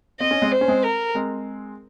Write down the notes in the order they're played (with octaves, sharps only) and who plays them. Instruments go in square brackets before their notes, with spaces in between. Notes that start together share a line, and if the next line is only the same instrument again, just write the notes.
[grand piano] C4 [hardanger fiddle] D#5
[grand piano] C#4
G#3 C4
[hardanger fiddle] C5
[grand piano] C#4
G#3 C4
[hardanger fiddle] A#4
[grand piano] G#3 C4